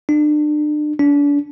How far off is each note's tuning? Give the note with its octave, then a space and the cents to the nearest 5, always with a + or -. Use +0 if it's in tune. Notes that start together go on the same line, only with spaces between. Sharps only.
D4 +35
D4 -35